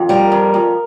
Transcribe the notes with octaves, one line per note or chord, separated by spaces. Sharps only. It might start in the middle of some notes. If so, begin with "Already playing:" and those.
Already playing: F2
G3 A#4
F2
F2